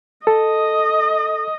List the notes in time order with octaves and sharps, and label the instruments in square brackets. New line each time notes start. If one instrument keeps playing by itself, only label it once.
[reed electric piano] A4 [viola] D#5